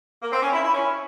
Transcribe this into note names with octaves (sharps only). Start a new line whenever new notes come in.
A#3
C4
C#4
E4
E4
C#4